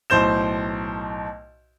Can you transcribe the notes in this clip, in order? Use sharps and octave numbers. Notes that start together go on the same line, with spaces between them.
B1 A2 C5 G6 E7